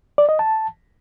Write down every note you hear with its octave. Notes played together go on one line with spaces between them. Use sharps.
D5
D#5
A5